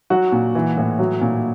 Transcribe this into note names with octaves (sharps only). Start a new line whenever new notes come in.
F#3 F#4
A#2
E3
A2
F#3
A#2